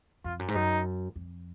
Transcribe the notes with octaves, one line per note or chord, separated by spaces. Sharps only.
F2 F4
F#2
G#2
F#2 D#4
F2